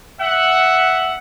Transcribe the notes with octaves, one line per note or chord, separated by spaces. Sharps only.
E5 F#5